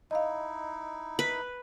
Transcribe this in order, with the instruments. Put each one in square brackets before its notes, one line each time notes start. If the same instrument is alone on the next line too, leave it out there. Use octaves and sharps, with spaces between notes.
[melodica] D#4 E4 [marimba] D#5 F5
[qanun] B4